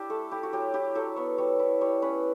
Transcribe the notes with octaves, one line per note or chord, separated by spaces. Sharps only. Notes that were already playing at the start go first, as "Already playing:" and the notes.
Already playing: D4 E4 G4
A3 A4
E4 G4
F#4
F#3 G4
E4 G4
F#3 A4
B3 C#5
G3 C#5
E4
G3 C#5
C#4 B4